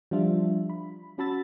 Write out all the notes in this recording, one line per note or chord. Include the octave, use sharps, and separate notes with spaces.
F3 G3 D4 F4 E5
B5
C#4 F#4 A5 B5 E6 A6